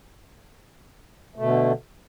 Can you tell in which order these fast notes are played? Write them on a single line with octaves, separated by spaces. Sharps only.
A3 B2 D3